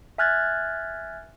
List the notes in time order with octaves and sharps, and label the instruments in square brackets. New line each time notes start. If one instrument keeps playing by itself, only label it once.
[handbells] E5 G#5 F6 F#6 G#6 A6